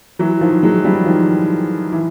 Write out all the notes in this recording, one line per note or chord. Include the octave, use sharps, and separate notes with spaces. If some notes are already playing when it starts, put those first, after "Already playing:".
E3 F#3
D#3 F3
F#3 G#3
F3 G3
D#3 F3
E3